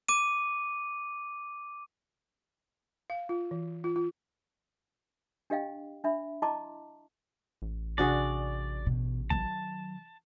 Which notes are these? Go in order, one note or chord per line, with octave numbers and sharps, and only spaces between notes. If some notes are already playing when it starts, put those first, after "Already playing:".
D6 D#7
F5
F4
E3
F4
F4
D4 G4 D#5 F5 G5
D4 E5 B5
E4 D#5 A5 A#5 C6 D6
A1
C3 D4 F#4 G#4 D5
B2
D#3 F#3 A5